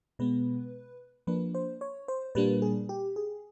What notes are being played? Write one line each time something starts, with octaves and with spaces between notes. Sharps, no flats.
B2 G#3 B3 B4
F3 A#3 D4 B4
C5
C#5
C5
A#2 G3 A#3 D4 B4
G#4
G4
G#4